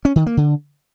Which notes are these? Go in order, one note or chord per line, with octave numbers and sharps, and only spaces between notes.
C#4
D#3
A#3
D3